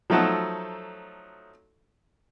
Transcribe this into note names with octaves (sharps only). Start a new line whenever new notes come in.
F3 F#3 A3 D#4 A4 F#5